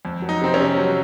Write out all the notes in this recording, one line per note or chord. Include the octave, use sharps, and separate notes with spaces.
F2
F#3
D#4
C3 C4
C#4
C3
F#3